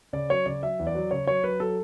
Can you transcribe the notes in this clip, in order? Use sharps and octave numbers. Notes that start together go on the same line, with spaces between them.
C#3 D5
F#3 C#5
C#3 D5
F#3 E5
E2
D5
F#3
C#3 C#5
F#3 C#5
F#3 B4
F#3 A4